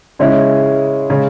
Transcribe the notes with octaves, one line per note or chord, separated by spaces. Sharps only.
C#3 G#3 C#4 E4
C#3 G#3 C#4